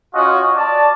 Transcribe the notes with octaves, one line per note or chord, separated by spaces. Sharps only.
C#4 F4 F#4 D#5
D5 A5